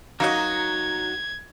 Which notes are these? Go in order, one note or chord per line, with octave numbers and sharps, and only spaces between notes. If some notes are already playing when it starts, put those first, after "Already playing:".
F#3 A#3 D#4 F#4 D#5 G#6